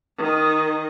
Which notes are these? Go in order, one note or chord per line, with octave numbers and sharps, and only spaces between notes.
D#3 D#5